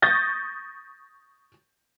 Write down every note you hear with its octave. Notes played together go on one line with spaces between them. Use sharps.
C#6 D#6 G6 A6 A#6